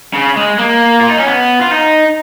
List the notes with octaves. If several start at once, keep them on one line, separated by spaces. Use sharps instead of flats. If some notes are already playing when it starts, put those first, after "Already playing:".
C#3
G#3
A#3
F4
D#4
C#4
B3
F4
D#4